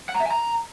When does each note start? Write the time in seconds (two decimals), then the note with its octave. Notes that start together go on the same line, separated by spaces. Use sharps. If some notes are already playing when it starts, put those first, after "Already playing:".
0.09 F#5
0.14 A#5
0.20 E5
0.25 G#5
0.31 A#5